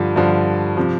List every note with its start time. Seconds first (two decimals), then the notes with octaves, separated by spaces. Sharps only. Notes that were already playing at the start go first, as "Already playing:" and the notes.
Already playing: G2 D3 F3
0.16 G2 D3 F3
0.77 C3 F3